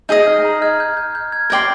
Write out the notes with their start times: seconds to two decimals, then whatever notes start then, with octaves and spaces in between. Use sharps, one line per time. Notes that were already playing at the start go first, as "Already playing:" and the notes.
0.09 D#4 G#4 D#5 G6
0.22 G6
0.27 F6
0.45 A#5
0.62 F6 G#6
0.80 G6
0.97 G6
1.15 G6
1.32 F6 G#6
1.50 A#4 D5 G5 C6 G6